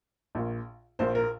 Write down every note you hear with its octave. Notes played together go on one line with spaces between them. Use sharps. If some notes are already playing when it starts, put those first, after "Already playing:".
A#1 A#2
A#1 A#2 C5
A#4